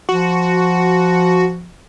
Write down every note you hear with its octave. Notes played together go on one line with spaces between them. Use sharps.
F3 F#4